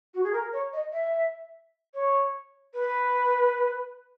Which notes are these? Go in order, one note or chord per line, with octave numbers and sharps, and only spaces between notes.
F#4
G#4
A#4
C#5
D#5
E5
C#5
B4